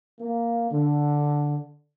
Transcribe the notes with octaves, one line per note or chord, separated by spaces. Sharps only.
A#3
D3